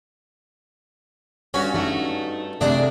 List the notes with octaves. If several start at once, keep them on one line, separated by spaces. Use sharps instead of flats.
G2 C#4 F#4 G#5 B5
A3 D#4 F#4
C3 A3 D4 D#4 G#4 D#5 F#5